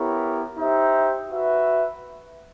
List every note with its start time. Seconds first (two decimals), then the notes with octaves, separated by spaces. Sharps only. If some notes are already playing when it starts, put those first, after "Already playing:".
Already playing: B3 E4 G4 A#4 C#5
0.59 D#4 G4 C5 E5
1.29 F#4 B4 E5